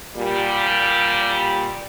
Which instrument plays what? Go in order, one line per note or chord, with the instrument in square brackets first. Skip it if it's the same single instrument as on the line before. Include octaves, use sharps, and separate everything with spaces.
[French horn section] A#2 G3